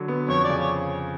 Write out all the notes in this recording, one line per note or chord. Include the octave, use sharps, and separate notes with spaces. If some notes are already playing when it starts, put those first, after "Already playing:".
Already playing: D3 F#3
B3
F2 C#5
D5
C#3
C#5